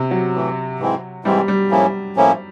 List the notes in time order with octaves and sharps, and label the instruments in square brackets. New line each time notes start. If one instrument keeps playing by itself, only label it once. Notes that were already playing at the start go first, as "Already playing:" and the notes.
Already playing: [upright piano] C3
F#3
[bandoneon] A2 E3 A3
G#2 E3 G#3 C4 E4
[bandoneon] G#2 E3 G#3 C4 E4 [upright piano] G3
[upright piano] G3
[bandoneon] A2 F3 A#3 C#4 E4
A2 F3 A#3 C#4 E4